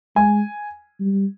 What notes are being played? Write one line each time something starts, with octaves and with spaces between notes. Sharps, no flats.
G#3 G#5
G3